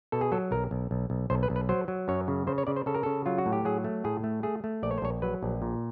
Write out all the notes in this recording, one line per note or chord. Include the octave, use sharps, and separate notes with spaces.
B2 A4
G#4
F#3 A4
B1 A#4
B1
B1
B1
B1 C5
B4
B1
B4
F#3 C5
F#3
F#2 C#5
C#3
C#3 C5
C#5
C#3 D5
C5
C#3 A4
A#4
C#3 A4
F#3 F4
F#4
A2
G4
F#3 G#4
A3
A2 G#4
A3
A3 G#4
A3
A#1 D5
C#5
C5
A#1 C#5
F#3 B4
A#1
A#2